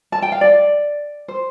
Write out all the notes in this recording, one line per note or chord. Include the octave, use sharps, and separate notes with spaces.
A5
G5
F5
D5
C5